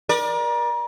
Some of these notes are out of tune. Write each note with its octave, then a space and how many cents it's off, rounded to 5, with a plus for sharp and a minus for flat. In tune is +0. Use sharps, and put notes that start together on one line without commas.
A#4 +35 D5 +15